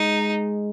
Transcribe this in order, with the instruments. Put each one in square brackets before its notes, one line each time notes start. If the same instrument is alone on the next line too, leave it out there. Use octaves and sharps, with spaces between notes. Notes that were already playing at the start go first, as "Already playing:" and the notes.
Already playing: [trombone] G#3 [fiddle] D#4